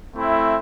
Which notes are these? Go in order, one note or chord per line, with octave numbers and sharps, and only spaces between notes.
A3 C4 E4